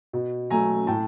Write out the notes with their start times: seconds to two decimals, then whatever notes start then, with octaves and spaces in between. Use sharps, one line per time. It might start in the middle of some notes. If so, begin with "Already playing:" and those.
0.13 B2
0.50 F#3 A3 G#5 A#5
0.87 A2 G5 A5